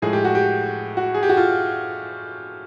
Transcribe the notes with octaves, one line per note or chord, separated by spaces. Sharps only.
A2 F3 G#3 G#4
G4
F#4
G4
F#4
G#4
G4
F#4
F4